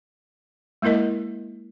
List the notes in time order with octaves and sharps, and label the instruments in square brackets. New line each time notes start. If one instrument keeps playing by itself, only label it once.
[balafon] G#3 A#3 E4 A#4 D#5